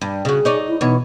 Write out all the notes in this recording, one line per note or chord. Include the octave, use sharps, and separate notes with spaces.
G2
C#3 F#4 G#4
D#4 C#5 D5
E4
B2 E3 D#4 C#5